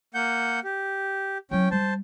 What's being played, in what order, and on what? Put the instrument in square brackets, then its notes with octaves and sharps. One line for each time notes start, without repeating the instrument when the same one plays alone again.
[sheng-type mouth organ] A#3 F#5 G6
G4
[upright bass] F#3 E4 [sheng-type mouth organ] C#4 G5
[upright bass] G3 [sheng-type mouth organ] C5 A5